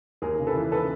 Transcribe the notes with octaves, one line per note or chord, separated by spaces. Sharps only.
D#2 G#4 A#4
C#3
A4 B4
E3
C#3 A4 B4